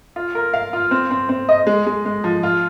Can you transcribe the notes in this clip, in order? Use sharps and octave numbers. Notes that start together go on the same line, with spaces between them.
F4
A#4
F5
F4
C4
C4
C4
D#5
G#3
G#3
G#3
F3
F4